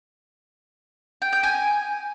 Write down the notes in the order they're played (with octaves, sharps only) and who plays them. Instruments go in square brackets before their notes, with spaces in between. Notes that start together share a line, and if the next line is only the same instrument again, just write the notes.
[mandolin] G5
G5
G#5